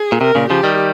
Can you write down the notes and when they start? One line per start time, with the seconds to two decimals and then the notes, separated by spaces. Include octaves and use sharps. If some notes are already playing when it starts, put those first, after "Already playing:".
Already playing: G#4
0.12 A#2
0.21 C3 A#4
0.35 A#2 C#3
0.49 C#3 F3 G4
0.63 D#3 G3